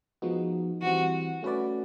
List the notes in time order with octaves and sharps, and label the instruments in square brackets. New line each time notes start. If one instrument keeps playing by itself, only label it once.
[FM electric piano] F3 G#3 B3 D#4 F#4
[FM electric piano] E3 G3 C4 [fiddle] F#4
[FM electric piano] A3 C#4 F#4 B4 D5